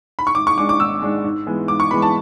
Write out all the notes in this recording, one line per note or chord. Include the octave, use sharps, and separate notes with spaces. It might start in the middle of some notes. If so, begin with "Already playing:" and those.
B5
C#6
G#1 D6
C#6
G#2 G#3 D4 D6
D6
G#1 E6
G#2 G#3 D4
G#2
E3 G#3 B3
G#2 D6
C#6
E3 G#3 B3 B5
A5